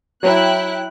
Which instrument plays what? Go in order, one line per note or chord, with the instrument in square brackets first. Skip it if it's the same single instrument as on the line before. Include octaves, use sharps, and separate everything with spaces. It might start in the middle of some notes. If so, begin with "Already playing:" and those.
[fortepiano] F#3 [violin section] E4 G5 F#6